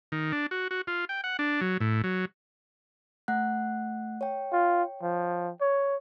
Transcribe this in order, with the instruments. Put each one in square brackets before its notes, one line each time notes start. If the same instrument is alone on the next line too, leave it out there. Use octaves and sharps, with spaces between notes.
[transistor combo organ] D#3
D4
F#4
F#4
F4
G5
F#5
D4
F#3
A2
F#3
[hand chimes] A3 F#5 F#6
C#5 G5
[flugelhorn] F4
F3
C#5